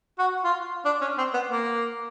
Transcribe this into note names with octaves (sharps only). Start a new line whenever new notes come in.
F#4
F4
D4
C#4
C4
B3
A#3